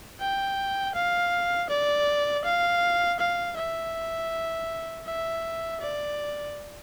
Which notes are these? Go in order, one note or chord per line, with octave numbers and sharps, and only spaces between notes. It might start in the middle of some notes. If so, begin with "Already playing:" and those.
G5
F5
D5
F5
F5
E5
E5
D5